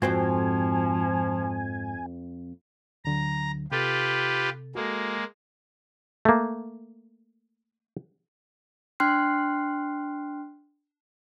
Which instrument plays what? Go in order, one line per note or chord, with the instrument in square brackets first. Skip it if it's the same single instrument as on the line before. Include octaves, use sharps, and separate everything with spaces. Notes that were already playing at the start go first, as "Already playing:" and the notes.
[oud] F2 C4 F#4 [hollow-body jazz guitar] G#2 C5 [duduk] F3 [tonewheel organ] G#5
[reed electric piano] D2 D3 F#3 [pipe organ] A#5
[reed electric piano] C3 A4 A6 [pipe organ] F4 G4 B4
[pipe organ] G#3 A#3 [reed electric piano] F#4 A4
[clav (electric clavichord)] A3 A#3
[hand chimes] D4 G5 C6 F6 F#6 C7